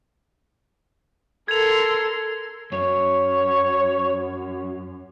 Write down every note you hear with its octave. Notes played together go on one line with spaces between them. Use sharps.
A4 A#4 C6 G#6 F7
F#2 C#5